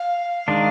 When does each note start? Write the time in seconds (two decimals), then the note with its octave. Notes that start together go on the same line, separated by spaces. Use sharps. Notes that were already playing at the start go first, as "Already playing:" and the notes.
Already playing: F5
0.48 D#3 G#3 D4